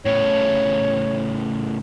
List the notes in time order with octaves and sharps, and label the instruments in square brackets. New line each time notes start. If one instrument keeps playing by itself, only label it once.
[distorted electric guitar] A2 C#3 [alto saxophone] C#5